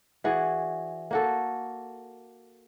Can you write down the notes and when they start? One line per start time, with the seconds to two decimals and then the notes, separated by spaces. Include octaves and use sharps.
0.24 E3 F#4 G#4 D5
1.11 A#3 F#4 A4